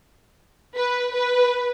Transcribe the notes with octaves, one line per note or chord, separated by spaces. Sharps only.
B4
B4